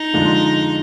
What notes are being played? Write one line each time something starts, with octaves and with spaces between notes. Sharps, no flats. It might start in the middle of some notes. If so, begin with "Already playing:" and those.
Already playing: D#4
F2 D3 G#3 D4 F4